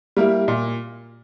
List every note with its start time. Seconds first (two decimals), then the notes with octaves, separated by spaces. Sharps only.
0.17 G3 A#3 E4
0.48 A#2